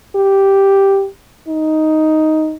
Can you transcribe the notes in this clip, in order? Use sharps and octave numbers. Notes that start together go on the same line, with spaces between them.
G4
D#4